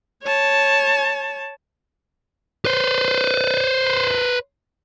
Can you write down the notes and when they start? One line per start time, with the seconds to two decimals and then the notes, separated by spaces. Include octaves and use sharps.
0.23 C#5 A5
2.65 B4 C5